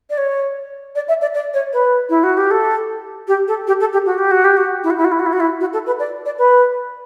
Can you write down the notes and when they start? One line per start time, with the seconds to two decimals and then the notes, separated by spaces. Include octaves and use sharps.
0.10 D5
0.17 C#5
0.95 D5
1.08 E5
1.21 D5
1.34 D5
1.53 C#5
1.73 B4
2.09 E4
2.23 F#4
2.37 G4
2.51 A4
3.27 G4
3.48 A4
3.67 G4
3.80 A4
3.93 G4
4.06 F#4
4.18 G4
4.31 F#4
4.44 G4
4.57 F#4
4.83 E4
4.90 F#4
4.97 E4
5.04 F#4
5.12 E4
5.19 F#4
5.26 E4
5.33 F#4
5.40 E4
5.60 F#4
5.73 A4
5.86 B4
5.99 D5
6.25 D5
6.38 B4